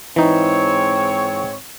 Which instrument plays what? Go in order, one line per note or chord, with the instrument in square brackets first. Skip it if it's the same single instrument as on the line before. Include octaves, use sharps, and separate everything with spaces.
[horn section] G#2 C4 C#5 [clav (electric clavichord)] E3 D#4